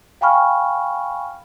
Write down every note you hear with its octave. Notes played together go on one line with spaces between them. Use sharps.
F5 G5 G#5 B5 C#6 F6